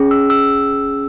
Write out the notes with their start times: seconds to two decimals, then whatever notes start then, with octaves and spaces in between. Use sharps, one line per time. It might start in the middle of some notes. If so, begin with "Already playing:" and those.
Already playing: C#4 G#4
0.11 E6
0.30 E6